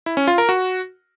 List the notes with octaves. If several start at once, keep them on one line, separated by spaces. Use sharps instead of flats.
E4
C#4
F4
A#4
F#4